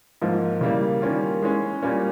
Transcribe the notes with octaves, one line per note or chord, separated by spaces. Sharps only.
G#2 F3 A#3
C#3 E3 G3 A#3
D#3 G3 A#3 C#4 F4
E3 G#3 C#4
A#2 G3 A#3 C#4